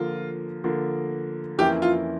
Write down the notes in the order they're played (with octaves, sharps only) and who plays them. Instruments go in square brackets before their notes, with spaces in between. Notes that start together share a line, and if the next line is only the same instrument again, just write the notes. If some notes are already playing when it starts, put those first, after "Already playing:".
Already playing: [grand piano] D3 F3 A#3 [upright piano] F4
[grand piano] D3 F3 A#3
[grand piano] F2 E3 A#3 C#4 E4 [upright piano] G4
[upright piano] F4